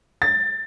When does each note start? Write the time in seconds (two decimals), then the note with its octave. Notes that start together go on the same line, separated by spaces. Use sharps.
0.22 A6